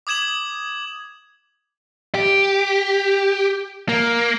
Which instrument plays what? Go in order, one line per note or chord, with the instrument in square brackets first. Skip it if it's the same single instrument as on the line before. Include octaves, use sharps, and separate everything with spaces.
[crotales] D6 D#6 G#6 E7 F#7
[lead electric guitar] G4
A#3